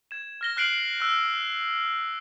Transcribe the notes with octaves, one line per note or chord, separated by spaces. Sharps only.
G#6 E7
F6 A#6 G7
F6 F#6 C7 D7 F#7
E6 F#6